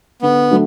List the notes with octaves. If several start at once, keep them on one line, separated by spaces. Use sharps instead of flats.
D3 B3
F#3 A3 D4